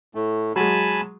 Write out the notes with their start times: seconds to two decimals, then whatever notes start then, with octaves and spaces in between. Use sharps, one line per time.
0.15 A2 A3
0.56 F#3 G#3 G#5 A5 B5